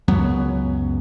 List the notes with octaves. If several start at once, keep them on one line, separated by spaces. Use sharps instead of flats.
C#2 F#2 F#3 B3